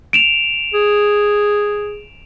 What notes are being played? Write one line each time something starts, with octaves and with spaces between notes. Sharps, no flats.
D7 E7 F7
G#4